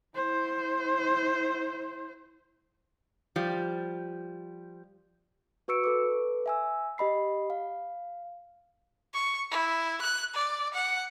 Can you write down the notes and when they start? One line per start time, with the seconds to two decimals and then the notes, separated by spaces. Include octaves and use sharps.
0.15 E4 C5
3.36 F3 G3
5.68 F#4 B4 C#6 E6 C#7 D7
5.84 A4 B4 D6
6.46 E5 G#5 E6
6.98 G4 D#5 B5 C7
7.50 F5
9.14 C#6
9.51 E4
10.02 F#6
10.35 D5
10.74 F#5